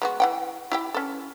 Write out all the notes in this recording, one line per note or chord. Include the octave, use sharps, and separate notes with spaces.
G#3 B3 F#4
E3 F#5 G5
E4 G4 G5
C#4 A4